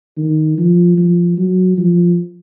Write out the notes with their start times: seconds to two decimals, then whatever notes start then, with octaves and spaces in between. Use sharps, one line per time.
0.17 D#3
0.58 F3
0.97 F3
1.38 F#3
1.78 F3